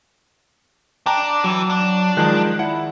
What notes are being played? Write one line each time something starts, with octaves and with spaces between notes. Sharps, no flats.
D4 G5 A5 A#5 D6
E3 F#3
D4
D#3 F3 G#3 F#6
E4 F#5